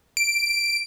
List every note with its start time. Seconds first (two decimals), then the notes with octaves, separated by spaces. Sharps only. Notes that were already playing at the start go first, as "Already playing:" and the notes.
0.17 D7